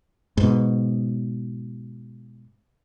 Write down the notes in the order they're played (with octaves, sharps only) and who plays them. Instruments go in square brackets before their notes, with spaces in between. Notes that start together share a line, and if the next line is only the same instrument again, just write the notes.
[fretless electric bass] G#2 B2